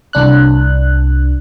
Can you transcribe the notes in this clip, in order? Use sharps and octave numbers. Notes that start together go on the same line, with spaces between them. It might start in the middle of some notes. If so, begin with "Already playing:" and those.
C2 D4 F#6